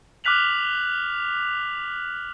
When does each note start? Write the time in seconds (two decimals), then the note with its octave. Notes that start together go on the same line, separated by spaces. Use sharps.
0.24 D6 F6 F#6 B6 F7 F#7